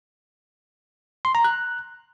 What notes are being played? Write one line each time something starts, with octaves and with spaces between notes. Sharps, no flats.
C6
A#5
F#6